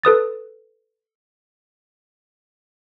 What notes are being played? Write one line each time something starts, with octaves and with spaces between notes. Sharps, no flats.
A4 B4 D#6 A6